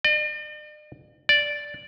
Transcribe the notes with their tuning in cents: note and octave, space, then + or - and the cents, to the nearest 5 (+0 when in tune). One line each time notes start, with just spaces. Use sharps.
D5 +45
D5 -5